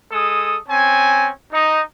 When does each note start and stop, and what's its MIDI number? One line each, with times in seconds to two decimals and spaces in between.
0.11 0.56 56
0.11 0.56 69
0.11 0.56 87
0.68 1.30 60
0.68 1.30 61
0.68 1.30 80
1.52 1.80 63